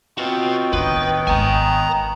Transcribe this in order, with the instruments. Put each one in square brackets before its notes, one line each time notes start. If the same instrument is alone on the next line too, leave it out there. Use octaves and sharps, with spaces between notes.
[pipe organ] C4 F4 [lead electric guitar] F#4 B4 [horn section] C#5 D#5 G5
[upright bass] A1 D4 [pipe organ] D#3 B3 [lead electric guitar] B4
[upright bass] G#1 G#2 [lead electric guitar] G#5 A#5